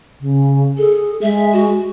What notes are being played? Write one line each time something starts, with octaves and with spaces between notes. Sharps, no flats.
C#3
G#4 A4
G#3 E5
F#4